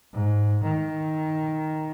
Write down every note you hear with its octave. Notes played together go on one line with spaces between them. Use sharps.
G#2
D#3